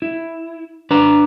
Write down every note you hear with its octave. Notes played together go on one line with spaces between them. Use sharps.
E4
D4 B4 A#5